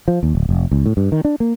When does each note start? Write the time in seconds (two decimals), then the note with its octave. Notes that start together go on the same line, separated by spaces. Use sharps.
0.08 F3
0.23 D#2
0.35 D1
0.49 F1
0.71 C#2
0.86 A2
0.97 G2
1.12 D#3
1.25 D4
1.40 A#3